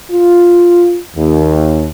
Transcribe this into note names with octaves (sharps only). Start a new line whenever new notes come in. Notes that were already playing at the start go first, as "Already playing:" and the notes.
F4
D#2